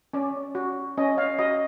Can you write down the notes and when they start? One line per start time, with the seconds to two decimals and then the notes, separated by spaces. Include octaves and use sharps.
0.13 C#4 D5
0.55 F#4
0.98 C#4 D#5
1.18 F5
1.39 F#4 D#5